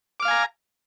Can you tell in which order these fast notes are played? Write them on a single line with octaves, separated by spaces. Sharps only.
D6 F6 F5 G#5 A#5